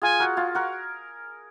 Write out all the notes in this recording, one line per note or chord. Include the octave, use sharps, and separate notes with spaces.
F4 G#4 G#5
F#4 A#4
F4 G#4
F#4 A#4